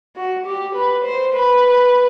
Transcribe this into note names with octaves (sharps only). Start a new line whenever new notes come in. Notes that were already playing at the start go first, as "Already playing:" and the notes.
F#4
G4
B4
C5
B4